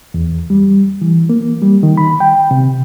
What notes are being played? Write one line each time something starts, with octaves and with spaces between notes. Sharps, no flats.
E2
G3
E3
A#3
G3
D#3
B5
G5
C3